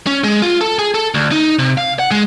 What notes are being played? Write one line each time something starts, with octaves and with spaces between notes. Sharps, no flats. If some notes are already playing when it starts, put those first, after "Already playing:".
C#4
G#3
F4
A4
G#4
A4
D2
D#4
C3
F5
F#5
G#3